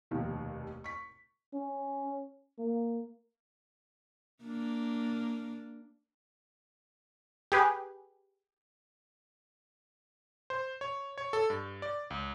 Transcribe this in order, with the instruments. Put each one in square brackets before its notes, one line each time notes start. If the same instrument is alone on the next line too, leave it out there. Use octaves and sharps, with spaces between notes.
[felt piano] F1 D#2 B2 D#3 F3
C#6 B6
[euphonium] C#4
A#3
[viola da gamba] A#3 D4
[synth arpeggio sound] G4 G#4 B4
[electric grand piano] C5
C#5
C#5
A4
G2
D5
C#2